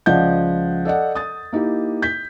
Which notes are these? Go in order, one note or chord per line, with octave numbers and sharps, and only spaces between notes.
C#2 F3 D5 D#5 F#5 G6
A4 D5 D#5 F#5
D#6 A6
A#3 D#4 E4 G4
G6 B6